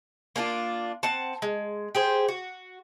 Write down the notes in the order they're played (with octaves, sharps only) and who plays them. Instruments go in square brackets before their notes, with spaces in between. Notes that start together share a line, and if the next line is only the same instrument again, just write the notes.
[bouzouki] A#3 C#4 D4 F4
C4 F#5 A5
G#3
G4 G#4 C5
F#4